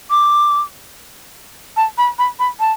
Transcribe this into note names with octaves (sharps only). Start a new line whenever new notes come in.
D6
A5
B5
B5
B5
A5